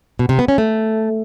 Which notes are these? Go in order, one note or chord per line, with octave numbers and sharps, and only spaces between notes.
B2
C3
B3
C#4
A3